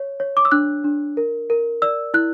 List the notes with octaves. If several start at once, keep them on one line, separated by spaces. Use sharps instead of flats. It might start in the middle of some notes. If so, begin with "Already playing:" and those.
Already playing: C#5
C#5
D6
E6
D4 F#6
D4
A#4
A#4
D5 E6
E4 F#6